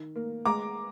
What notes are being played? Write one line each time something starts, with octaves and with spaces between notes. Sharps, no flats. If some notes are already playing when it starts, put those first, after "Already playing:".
Already playing: D#3
A#3
G#3 A#5 D6